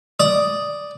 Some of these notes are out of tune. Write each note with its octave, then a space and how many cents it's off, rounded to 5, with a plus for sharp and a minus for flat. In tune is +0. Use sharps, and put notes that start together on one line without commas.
D5 +0 D#6 +0